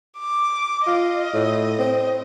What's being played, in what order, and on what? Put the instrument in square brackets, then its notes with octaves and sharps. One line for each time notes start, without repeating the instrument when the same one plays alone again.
[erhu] D6
[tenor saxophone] F4 [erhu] D#5
[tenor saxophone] A2
C4